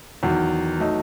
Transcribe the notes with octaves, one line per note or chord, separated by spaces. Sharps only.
E2 D#3 F#3
F#3 A3 D#4